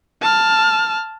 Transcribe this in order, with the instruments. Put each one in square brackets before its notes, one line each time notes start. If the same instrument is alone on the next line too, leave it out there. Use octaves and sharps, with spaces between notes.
[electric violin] A5 F6